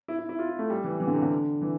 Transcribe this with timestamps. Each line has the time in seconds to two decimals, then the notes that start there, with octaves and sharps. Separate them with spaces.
0.08 E4
0.19 E4
0.29 E4
0.39 F4
0.49 E4
0.59 A3
0.70 G3
0.84 E3
1.00 E3
1.07 D3
1.15 C3
1.22 D3
1.61 E3